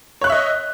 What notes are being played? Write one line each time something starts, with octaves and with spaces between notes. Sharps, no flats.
C#5 D#5 E5 C#6 F#6